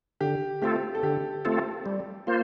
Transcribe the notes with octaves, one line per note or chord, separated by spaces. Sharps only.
D3 G4
A3 C4 F4 G4 A4
A4
D3 G4
A3 C4 F4 A4
G3
A#3 F4 C5